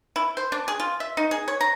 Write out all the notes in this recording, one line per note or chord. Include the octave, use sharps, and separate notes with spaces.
E4
C5
D4
G#4
F4
E5
D#4
G#4
C#5
A#5